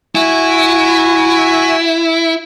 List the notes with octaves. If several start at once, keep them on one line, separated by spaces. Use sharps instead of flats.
E4 F#4 G#5